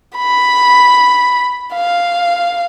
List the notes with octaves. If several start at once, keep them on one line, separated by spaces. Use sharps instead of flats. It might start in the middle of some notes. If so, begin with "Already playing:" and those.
B5
F5